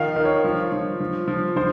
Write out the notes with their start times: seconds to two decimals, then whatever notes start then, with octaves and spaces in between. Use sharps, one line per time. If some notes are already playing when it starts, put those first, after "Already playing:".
Already playing: D#3 F3 F5
0.16 D#3
0.25 C#5
0.44 F3
0.72 F3
1.00 F3
1.28 F3
1.56 F3 C5